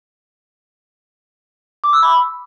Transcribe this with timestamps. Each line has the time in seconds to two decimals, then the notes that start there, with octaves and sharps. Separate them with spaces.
1.84 D6
1.93 E6
2.03 B5